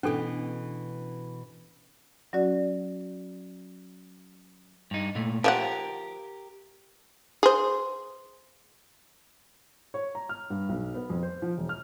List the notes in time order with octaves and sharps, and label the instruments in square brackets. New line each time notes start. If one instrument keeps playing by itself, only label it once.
[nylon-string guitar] B2 E3 [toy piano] C#4 D4 A4
[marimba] F#3 C#4 F#4 D5
[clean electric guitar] G2 D#4
A#2 A3
[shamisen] F3 C5 F#5 [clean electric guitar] G4 A#4
[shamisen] G#4 C5
[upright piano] C#5
A#5
F6
G2
B1
B3
F2
C5
F3
E1
F6